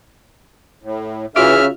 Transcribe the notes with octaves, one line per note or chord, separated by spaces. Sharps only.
A2
C#3 E3 C#4 F4 F#4 E5 F5 F6